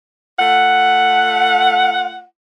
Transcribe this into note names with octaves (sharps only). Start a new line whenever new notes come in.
A3 F4 F#5